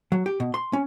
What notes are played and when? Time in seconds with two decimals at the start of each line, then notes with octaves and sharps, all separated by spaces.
0.12 F#3
0.26 G4
0.40 B2
0.54 C6
0.73 C#4